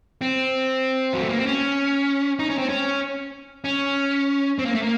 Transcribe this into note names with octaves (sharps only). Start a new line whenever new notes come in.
C4
F#3
A3
A#3
C4
C#4
D#4
C#4
C4
C#4
C#4
C4
A#3
A3
A#3